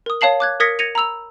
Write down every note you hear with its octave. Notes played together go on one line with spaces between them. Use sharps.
A#4 D#6
C#5 F5 A5 C7 F#7
D6 F#6 G#6
A#4 D#6 G#6 A#6 B6 C#7
G#6 A#6 C#7 D#7 F7
A#5 B5 E6 F7